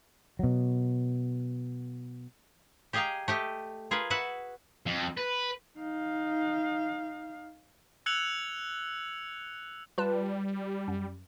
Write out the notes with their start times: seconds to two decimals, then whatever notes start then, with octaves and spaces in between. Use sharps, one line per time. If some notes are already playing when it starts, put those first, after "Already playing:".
0.39 B2 F#3
2.93 G4 G#4 D#5 F5 G5 A#5
3.28 A3 G4 D#5
3.91 F4 G#4 A#4 B4
4.10 F#4 B4 E5 F#5
4.86 F2
5.17 B4
5.79 D#4 F5
8.06 E6 F#6 G#6 C#7 F7 F#7
9.98 G3 F4 B4 A5
10.88 F#2